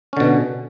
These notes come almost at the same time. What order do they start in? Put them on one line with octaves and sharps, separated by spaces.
C#4 D3 B2